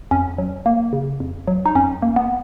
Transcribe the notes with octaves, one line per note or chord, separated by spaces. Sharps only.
F2 C#4
F#3
A#3
C#3
F2
F#3
D#4
F2 C#4
A#3
B3